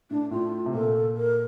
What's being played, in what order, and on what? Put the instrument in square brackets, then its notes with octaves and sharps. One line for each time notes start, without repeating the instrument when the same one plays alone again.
[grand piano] A2 [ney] D4
[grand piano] A2 [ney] F4
[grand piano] C3
[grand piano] A#2 [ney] A4
[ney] A#4